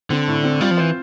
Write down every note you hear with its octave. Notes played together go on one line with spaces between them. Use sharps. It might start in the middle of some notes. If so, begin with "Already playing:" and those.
D3 C4
A2
C4
G3 F4
F3
E3 C5